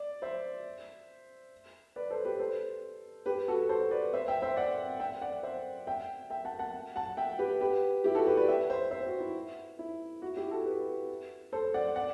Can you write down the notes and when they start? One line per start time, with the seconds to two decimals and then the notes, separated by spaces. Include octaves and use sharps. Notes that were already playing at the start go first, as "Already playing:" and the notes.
Already playing: D5
0.22 C5 E5
1.96 B4 D5
2.10 A4 C5
2.25 G4 B4
2.39 A4 C5
3.26 G4 B4
3.48 F#4 A4
3.69 A4 C5
3.91 B4 D5
4.13 C5 E5
4.28 E5 G5
4.42 C5 E5
4.56 D5 F#5
5.00 E5 G5
5.21 D5 F#5
5.43 C5 E5
5.87 E5 G5
6.30 E5 G5
6.45 F#5 A5
6.59 F#5 A5
6.96 F#5 A5
7.17 E5 G5
7.39 G4 B4
7.61 G4 B4
8.04 E4 G4
8.15 F#4 A4
8.27 G4 B4
8.37 B4 D5
8.48 E5 G5
8.70 C5 E5
8.91 C5 E5
9.06 F#4
9.20 E4
9.79 E4
10.22 F#4
10.37 E4 G4
10.51 F#4 A4
10.66 G4 B4
11.53 A4 C5
11.74 D5 F#5
11.96 D5 F#5